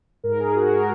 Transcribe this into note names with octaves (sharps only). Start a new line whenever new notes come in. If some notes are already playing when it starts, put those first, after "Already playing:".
G#2 A#4
G#2 G#4
G#2 F#4
A#4